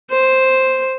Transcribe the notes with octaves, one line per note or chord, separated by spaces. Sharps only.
C5